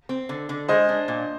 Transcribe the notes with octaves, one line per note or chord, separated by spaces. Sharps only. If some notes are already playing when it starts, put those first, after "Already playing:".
C4
D3
D3
G#3 C5 D#5
D4
A#2